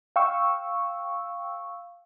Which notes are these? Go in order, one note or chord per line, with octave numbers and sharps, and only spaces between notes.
F5 G5 C#6 E6